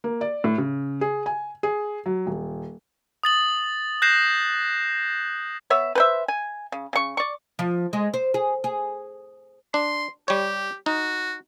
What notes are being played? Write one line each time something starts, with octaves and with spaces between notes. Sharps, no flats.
A#3
D5
A2
C#3
G#4
G#5
G#4
F#3
D#1
D#6 A6 F#7
F#6 G6 A#6 C7 E7
B3 C#5 E5
B4 C5 E5
G#5
C#3
C#3 C#6
D5 C#6
F3
G#3
C5
G#4
G#4
D4 C6
G3 G4 C#5
D#4 F#4